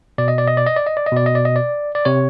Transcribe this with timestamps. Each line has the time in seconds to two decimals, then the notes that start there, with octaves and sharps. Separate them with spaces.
0.18 B2 D5
0.28 D#5
0.38 D5
0.48 D#5
0.57 D5
0.66 D#5
0.76 D5
0.87 D#5
0.97 D5
1.06 D#5
1.12 B2 D5
1.26 D#5
1.35 D5
1.45 D#5
1.56 D5
1.95 D5
2.05 C3 C#5